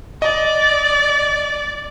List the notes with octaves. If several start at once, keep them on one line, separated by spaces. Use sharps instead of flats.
D5 D#5